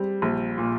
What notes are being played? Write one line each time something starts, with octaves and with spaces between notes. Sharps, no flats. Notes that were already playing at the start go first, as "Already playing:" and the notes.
Already playing: G3 C4
A#1
A#2